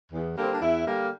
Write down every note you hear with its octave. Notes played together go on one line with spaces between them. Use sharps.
E2
D3 G3 A#3
C4
D4
E2 E4
D3 G3 A#3